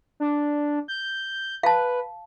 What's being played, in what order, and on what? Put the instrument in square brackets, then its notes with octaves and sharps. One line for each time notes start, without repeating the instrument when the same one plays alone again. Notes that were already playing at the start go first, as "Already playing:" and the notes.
[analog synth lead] D4
G6
[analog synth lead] B4 [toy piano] F5 A5